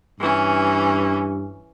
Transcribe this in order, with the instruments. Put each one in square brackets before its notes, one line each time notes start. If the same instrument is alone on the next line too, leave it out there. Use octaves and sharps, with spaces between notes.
[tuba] G2 [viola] E3 C#4